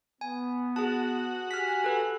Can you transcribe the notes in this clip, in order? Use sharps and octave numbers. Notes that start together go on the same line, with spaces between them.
B3 G#5
F#4 G#4 A5
G4 G#5 F6 B6
A4 B4